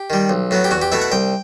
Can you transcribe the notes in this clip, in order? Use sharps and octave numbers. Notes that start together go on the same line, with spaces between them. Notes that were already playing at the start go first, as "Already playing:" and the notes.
Already playing: G4
D#3 G3
B1
A2 F#3 B3
G4
E2 F#4
G4
B2 A3 E4 E5
F#5
C2 G5